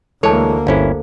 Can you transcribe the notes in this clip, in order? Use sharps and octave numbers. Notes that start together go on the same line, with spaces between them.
D2 E3 G#3 A#3 A4 C#5 A5
G1 C#4 E4 A4 C5 F5